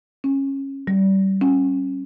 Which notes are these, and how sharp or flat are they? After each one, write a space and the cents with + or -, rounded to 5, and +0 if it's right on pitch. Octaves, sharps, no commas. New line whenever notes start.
C#4 -20
G3 -25
C#4 -20